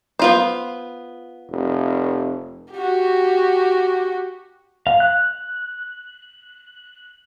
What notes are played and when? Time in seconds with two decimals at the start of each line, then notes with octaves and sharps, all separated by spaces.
0.19 B3 F4 C5
1.49 F1
2.73 F#4 G4
4.87 F5
5.00 F#6